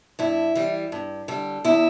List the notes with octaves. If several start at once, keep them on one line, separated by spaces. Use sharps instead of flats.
G2 E4
E3 G3
G2
D3 G3
E2 E4